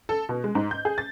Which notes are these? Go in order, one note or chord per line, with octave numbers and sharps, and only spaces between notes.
A4
B2
G#3
G#2
G6
G#4
A6